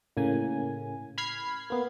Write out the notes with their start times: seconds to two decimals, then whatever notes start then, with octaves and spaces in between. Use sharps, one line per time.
0.17 A2 C#3 A#3 G#5
1.18 B5 F6 G#6 B6 C7
1.70 A#3 B3